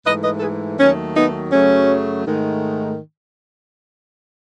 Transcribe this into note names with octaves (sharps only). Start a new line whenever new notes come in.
G#2 E3 A3 B4 D#5
B4 D#5
A4
G#4 B4
D#2 D#3 F#3 A3 C#4
B3 D#4
F#2 C#3 F#3 A3 C#4
G#2 D#3 A3